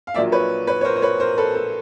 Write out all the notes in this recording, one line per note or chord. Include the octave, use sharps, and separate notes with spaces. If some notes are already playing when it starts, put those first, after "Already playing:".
F5
A#1 A#2 F#3 A#3 D5 E5
B4 C#5
B4 C#5
C#5
A#4 C5
C5
B4 C#5
A#4 C5
A4 B4
A4